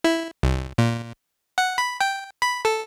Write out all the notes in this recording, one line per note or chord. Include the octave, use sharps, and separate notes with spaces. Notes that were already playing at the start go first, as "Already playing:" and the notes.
E4
C2
A#2
F#5
B5
G5
B5
A4